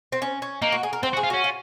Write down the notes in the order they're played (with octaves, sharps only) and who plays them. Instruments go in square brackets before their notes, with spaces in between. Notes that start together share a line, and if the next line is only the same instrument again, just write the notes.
[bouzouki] C4
C#4
C#4
[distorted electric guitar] A#3 [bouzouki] D#4
[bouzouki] F#4
G#4
A#4
[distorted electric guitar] C4 [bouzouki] C5
[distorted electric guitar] F#4
[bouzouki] G#4
[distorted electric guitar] F4
[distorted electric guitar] C#4 [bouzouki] F#4
[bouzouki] F4